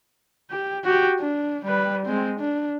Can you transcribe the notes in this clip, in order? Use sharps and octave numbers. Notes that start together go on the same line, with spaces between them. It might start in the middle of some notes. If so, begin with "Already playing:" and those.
G4
F#4 G4
D4
G3 B4
G#3 C4
D4